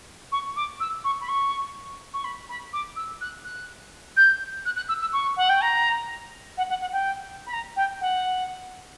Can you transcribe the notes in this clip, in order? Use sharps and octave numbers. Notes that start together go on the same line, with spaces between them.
C#6
D6
E6
C#6
B5
C#6
C#6
B5
B5
D6
E6
F#6
F#6
G6
F#6
F#6
E6
E6
C#6
F#5
G5
A#5
F#5
F#5
F#5
G5
B5
A#5
G5
F#5